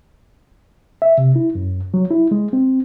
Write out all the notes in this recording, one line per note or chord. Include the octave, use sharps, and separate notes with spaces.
E5
C3
E4
F#2
F#3
E4
G#3
C4